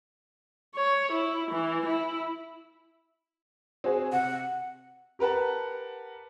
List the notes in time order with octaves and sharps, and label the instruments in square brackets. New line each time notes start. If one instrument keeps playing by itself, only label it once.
[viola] C#5
E4
E3
E4
[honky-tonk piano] C4 F#4 G#4
[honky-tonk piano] C3 [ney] F#5
[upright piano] G4 A#4 B4 F#5 A5